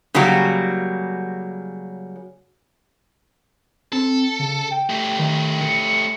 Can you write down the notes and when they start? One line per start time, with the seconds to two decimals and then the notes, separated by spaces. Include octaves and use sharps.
0.14 C#3 F#3 G3 A#3 F#4
3.93 C4 A4
4.39 C#3
4.71 G5
4.90 A3 G4
5.19 D#3
5.61 C#7